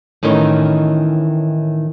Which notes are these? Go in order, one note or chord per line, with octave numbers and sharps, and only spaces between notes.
A2 D#3 E3 C#4 D#4